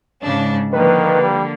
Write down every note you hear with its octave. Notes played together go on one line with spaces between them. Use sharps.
G#2 C#3 D4
D3 D#3 F3 A#3 B4
G3